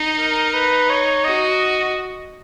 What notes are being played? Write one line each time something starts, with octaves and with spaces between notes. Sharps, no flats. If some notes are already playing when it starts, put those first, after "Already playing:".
Already playing: D#4
A#4
B4
C#5
F#4 D#5